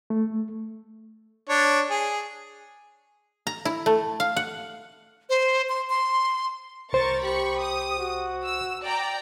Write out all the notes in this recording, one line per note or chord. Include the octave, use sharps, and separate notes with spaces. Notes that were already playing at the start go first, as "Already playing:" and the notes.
A3
D4 C#5
G#4
A#5
E4
A3
F5
F#5
C5
C6
C6
C2 A#4 C5 C#6 A6
G4 B5 C#6
D#6
F#4
E6
D5 G5 A#5